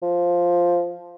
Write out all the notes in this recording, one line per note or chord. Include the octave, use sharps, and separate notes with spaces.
F3